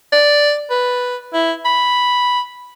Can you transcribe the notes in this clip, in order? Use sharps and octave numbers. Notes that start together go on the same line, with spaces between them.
D5
B4
E4
B5